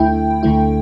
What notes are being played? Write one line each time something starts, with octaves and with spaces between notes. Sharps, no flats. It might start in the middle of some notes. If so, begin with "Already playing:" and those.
Already playing: D2 D3 A3 E4 G5
D2 D3 A3 E4